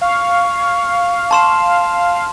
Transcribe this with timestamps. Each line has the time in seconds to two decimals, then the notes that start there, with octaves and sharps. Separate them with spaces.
0.01 F5 C#6
1.31 A5 C6 E7